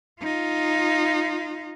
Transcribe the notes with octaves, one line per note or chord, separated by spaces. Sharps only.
D#4 F4